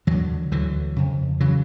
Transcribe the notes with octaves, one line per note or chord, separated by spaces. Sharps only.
D#2 D3 E3 F#3
D2 D3 E3 F#3
F2 C#3
C#3 E3 F#3